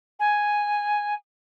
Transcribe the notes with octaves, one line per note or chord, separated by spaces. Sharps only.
G#5